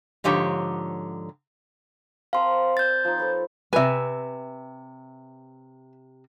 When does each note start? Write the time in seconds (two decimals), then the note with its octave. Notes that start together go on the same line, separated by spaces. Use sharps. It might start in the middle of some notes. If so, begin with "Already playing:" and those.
0.24 G#2 D3 F3 G4 C#5 A#5
2.33 C4 A#4 F5 A5 C6
2.77 D5 E6 G6 A6
3.05 F3 D#4
3.18 A4 B4 C#5
3.73 C3 B4 E5 G#5